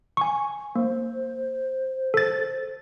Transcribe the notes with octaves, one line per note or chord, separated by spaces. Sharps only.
G#5 C#6
A#3 C5
A4 A6